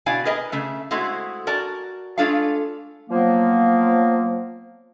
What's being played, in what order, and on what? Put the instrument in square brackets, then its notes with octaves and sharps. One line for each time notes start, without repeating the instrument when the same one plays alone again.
[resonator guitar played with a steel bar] B2 E4 D5 F5 G#5
G#4 A#4 B4 D#5 G#5
C#3 A3 E5
G#3 A3 C4 E4 F#4
F#4 A#4 D5 G#5 A5
G#3 A3 D4 F4 A4 F5
[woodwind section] F3 F#3 A#3 B3